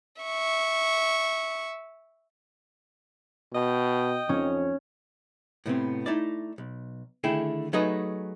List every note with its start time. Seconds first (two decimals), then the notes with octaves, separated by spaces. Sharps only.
0.22 E5 C#6
3.53 B2 D#5 G5
4.29 F2 C#4
5.66 A2 C3 B3 C4
6.06 A3 D#4 E4 D5
6.58 B1
7.24 D3 D#3 A3 E4 G#4 G5
7.73 F#3 A3 D#4 G#4 B4 D#5